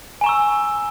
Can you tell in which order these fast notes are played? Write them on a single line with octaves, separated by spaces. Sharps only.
G#5 A#5 C#6 E6